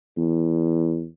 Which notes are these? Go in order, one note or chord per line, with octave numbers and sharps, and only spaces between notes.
E2